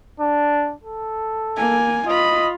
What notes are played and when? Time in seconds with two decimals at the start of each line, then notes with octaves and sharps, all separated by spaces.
0.20 D4
0.83 A4
1.57 A#3 G#5
2.08 F4 D#5 B5